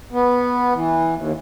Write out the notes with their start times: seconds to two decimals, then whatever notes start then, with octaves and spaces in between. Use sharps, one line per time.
0.12 B3
0.74 E3
1.15 D#2